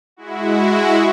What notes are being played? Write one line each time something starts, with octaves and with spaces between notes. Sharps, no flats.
G#3 E4 F#4